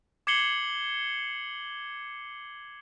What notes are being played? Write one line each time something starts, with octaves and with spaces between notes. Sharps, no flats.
D6 G#6 C7 C#7 F#7 G7